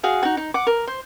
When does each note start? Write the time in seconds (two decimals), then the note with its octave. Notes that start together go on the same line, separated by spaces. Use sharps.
0.03 F#4 G#4 F5
0.23 D#4 F#4
0.37 D#4
0.54 F#5 D6
0.67 A#4
0.88 C5